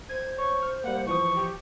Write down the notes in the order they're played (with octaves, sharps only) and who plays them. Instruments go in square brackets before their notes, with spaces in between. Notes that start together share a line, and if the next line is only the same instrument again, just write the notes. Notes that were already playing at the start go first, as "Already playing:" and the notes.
[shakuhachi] C5 [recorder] G#6
[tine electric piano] C#5 [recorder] C#6
[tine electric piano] F6
[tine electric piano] G3 A#3 [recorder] F#5
[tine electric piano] E3 F3 D#6 [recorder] C#6
[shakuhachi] G4